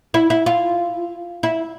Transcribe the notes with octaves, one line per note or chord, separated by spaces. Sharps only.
E4
E4
F4
E4